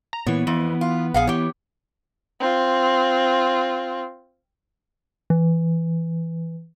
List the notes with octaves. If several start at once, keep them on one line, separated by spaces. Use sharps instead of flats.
A#5
A#2 E3 B3 C#5
F2 E3
F4
A#1 G#4 F5 F#5
E3 G4 C#5
C4 F4
E3